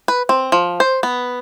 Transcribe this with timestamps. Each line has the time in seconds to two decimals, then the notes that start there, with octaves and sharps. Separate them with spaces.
0.08 B4
0.29 C4
0.52 F3
0.80 C5
1.03 B3